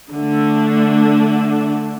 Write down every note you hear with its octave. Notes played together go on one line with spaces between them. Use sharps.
D3 A3 D4